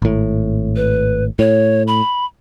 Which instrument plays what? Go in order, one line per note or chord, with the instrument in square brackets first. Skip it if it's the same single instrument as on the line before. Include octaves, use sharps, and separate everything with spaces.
[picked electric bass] G#1 A2
[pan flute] B4
[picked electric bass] A2 [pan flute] C#5
[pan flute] B5